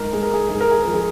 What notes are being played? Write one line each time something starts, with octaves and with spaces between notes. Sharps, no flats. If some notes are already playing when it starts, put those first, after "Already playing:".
Already playing: G#2 A#4
G#3 G#4
A#4
G#4
G#2 G#4
A#4
G#4
F3 A#4
G#4